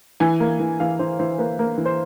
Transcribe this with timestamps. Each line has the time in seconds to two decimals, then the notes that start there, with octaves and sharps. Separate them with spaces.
0.20 E3 G#5
0.40 A#3
0.60 E3
0.80 E3 F5
0.99 E3 C5
1.19 E3 C5
1.38 A#3 B4
1.59 A#3
1.78 E3
1.86 C5